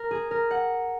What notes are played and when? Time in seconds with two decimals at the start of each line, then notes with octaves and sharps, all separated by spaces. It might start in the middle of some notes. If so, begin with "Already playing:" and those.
Already playing: A#4
0.11 G#4
0.31 A#4
0.51 F#5